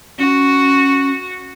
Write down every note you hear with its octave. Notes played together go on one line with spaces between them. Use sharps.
C#4 F#4